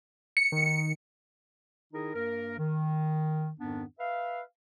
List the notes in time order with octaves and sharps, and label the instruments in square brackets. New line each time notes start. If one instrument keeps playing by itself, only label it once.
[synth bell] C#7
[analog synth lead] D#3
[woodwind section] D#3 D#4 E4 G#4 A#4
G2 A#3 A#4
D#3
F2 G#2 D#3 B3 D4
B4 E5 F5